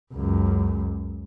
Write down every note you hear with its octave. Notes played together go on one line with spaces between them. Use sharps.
C#2 F#2